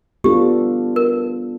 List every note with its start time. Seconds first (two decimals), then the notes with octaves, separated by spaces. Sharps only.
0.24 G3 B3 D4 F4 G4 A4
0.96 A#4